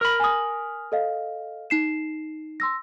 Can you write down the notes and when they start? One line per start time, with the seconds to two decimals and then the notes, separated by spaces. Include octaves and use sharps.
0.01 A#4 B5
0.20 G#5 D#6
0.92 A4 D#5 F5
1.70 D#4 C7 E7
2.60 C6 E6 A#6